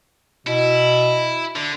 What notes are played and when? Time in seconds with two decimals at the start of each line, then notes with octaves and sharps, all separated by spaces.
0.47 B2 E4
1.56 D3